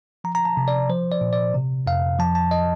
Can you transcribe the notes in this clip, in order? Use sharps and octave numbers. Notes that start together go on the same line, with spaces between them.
F3 A#5
A#5
A5
C3
D5
F3 C5
D5
A#2
D5
C3
F2 F5
F3 A5
A5
D#5